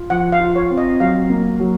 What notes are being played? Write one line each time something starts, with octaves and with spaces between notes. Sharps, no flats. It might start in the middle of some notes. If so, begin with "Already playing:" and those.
Already playing: F4
F3 F#5
F5
F4
C#5
C4
D#5
F#3 F5
A#3
F#3